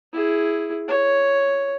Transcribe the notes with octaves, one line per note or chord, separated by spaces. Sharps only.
E4 G#4
C#5